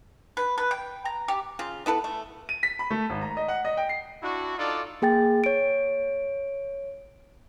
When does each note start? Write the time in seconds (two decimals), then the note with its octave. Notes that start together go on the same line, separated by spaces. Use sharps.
0.37 B4
0.58 B4
0.71 G5
1.05 A#5
1.28 G4
1.59 C#3 F4
1.86 B3 E4 A4 B4
2.04 A3
2.49 D#7
2.63 B6
2.79 B5
2.90 A3
3.10 G#1
3.21 A#5
3.37 D#5
3.48 F#5
3.65 D#5
3.77 G5
3.89 C7
4.23 D4 E4 F#4
4.58 D4 D#4 F4 A4 D5
5.02 A#3 G#4 G5 A6
5.44 C#5 D7